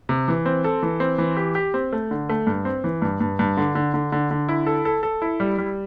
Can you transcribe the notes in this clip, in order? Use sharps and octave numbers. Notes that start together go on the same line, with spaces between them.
C3
E3
C4
A4
E3
C4
E3
G4
G4
C4
A3
D3
A3
G2
C4
E3
G2
G2
G2
D3
D3
D3
D3
D3
E4
A4
A4
A4
E4
G3
G3